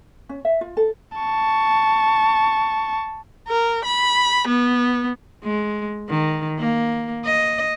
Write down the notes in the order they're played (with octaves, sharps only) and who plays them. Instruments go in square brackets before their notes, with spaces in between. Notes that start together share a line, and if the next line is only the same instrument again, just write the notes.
[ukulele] C#4
E5
F4
A4
[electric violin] A5 C#6
[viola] A#4
B5
B3
[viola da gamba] G#3
D#3
A#3
D#5